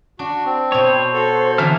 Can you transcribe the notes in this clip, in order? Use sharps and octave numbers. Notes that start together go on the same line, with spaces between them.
D4 F#4
C4
B2 E4 C5 C#5
F#4 A4
D3 E3 A#3 E5 A5 F6